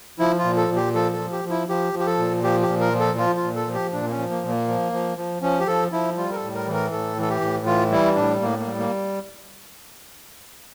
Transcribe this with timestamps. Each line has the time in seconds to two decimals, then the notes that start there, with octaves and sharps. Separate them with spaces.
0.19 F3 E4
0.39 F4
0.44 A#2
0.57 A4
0.69 A#2
0.76 G4
0.94 F3 A4
1.13 A4
1.19 F3
1.32 G4
1.45 F3
1.51 E4
1.69 F3 G4
1.93 F3
1.99 G4
2.06 A4
2.18 A#2
2.43 F3 G4
2.62 G4
2.68 A#2
2.80 A#4
2.93 F3
3.00 A4
3.18 F3 F4
3.36 F4
3.43 A#2
3.55 A4
3.67 F3
3.74 G4
3.93 A#2 D4
4.07 A#3
4.11 C#4
4.18 F3
4.30 A#3
4.43 A#2
4.49 A#3
4.68 F3
4.92 F3
5.17 F3
5.42 F3 C#4
5.60 G4
5.67 F3 A4
5.92 F3 E4
6.17 G3 F4
6.31 A#4
6.35 A4
6.42 A2
6.55 A#4
6.67 E3
6.73 A#4
6.92 A2 A4
7.17 E3 A4
7.30 G4
7.41 A2
7.66 E3 F4
7.92 G3 E4
8.16 A2 D4
8.41 A2 A#3
8.60 A#3
8.66 G3
8.78 A#3